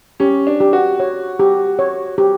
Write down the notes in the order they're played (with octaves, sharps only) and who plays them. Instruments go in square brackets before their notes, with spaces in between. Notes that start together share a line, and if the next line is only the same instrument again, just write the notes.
[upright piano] C#4 [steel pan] G4
[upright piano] D4
[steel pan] G4
[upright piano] F#4
[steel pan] C#5
G4
C#5
G4